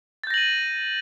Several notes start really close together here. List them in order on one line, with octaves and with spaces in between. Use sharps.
A6 G6 A#6 F#7 D#7